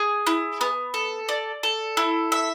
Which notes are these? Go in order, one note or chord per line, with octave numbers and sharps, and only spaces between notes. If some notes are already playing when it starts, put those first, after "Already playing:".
Already playing: G#4
E4
B3
A4
D5
A4
E4
E5